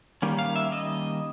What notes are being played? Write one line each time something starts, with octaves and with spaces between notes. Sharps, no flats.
D#3 G3 A#3 C#4
F5
E5
D#5